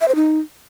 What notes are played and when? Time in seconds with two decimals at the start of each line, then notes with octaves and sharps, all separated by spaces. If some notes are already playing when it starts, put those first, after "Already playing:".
0.01 E5
0.08 C5
0.15 D#4